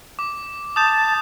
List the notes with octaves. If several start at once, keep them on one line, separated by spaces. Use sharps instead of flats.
D6
A5 D#6 G6 E7